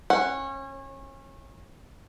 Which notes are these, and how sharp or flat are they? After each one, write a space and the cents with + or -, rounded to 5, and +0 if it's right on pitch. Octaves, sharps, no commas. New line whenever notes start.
C#4 -30 F#5 +0